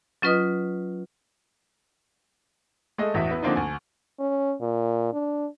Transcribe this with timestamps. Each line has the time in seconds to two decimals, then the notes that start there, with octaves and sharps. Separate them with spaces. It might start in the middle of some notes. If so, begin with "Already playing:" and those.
0.22 F#3 C#4 F4 B4 D#5 D#6
2.98 G#3 A3 A4 D#5
3.14 A1 E2 F#4 E5
3.31 B3 E4
3.43 D3 F3 A#3 C4 D4 D#4
3.56 D2 G#5
4.19 C#4
4.61 A#2
5.13 D4